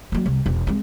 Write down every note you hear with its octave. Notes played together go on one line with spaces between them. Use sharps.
F#3 A#3
C2
E1
G#3 C4